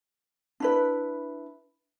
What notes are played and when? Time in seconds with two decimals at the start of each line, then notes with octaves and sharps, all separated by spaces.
0.60 D4 E4 B4